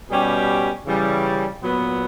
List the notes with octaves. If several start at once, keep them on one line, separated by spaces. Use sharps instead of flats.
B2 G3 C#4 G4
C#3 E3 G3 C#4
A#2 F#3 B3